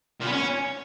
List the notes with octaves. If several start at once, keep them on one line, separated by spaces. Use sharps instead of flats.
A#2
B3
C#4